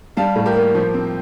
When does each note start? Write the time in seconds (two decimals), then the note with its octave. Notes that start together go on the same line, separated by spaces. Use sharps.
0.17 G3 F5 A5
0.36 A2
0.45 G4 A#4
0.56 A#3
0.75 F3
0.94 C4